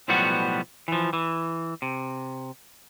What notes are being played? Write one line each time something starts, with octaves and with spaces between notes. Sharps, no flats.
B1 A2 F3 G3 B3 F#4
E3 F3
E3
C3